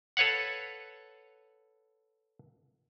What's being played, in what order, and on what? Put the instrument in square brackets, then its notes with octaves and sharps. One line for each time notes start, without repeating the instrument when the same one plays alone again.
[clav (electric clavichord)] A4 B4 C#5 F5 F#5